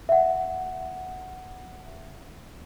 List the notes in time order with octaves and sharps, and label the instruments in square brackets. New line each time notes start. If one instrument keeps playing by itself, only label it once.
[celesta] E5 F#5